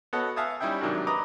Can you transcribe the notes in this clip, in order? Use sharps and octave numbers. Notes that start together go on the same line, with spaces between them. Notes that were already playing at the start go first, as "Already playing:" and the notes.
B3 F#4 A4 C#5 D#5 F#5
E5 F5 G#5 A5 D#6
G3 C#4 D#4 E4 E5 G5
G#2 C3 D#3 F#3 D4
B4 D#5 A#5 D6 D#6